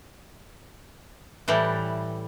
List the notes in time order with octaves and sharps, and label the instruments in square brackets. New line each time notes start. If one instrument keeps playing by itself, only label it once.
[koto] A2 E3 G3